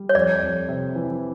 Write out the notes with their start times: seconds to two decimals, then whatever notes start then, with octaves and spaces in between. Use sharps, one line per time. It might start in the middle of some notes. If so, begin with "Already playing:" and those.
Already playing: G3
0.09 C#5
0.15 F2 D5
0.42 F2
0.68 C3
0.95 E3